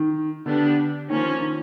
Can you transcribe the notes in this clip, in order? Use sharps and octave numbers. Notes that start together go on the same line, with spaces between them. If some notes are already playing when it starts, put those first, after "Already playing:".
Already playing: D#3
D3 B3 D4 G4
D#3 F3 A#3 C#4
D#3